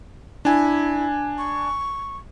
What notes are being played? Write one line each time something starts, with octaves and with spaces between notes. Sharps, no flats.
D4 E4 G#5
C#6